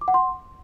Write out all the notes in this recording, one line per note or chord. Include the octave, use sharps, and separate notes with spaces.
D6
F#5
C6